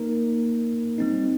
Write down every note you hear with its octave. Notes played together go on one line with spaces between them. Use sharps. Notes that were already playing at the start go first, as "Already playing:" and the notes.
Already playing: A#3 D#4 A#4
G3 C4 D#4